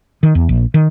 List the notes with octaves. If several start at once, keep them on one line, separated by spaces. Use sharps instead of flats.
D#3
E2
A#1
D#3